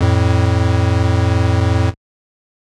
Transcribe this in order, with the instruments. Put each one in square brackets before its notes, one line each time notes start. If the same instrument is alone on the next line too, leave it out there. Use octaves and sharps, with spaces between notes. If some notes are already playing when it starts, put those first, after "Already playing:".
[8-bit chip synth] F2 A2